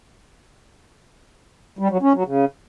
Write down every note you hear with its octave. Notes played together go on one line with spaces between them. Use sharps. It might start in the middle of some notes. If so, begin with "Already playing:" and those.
G3
F#3
C#4
F#3
C#3